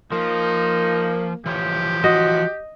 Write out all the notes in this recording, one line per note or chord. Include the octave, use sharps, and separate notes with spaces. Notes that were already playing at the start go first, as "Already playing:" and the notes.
F3 A#3 D#4
E3 F3 G4 C#5
F#4 D#5